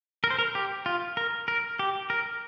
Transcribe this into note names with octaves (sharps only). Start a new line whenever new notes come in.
A#4
C5
A#4
G4
F4
A#4
A#4
G4
A#4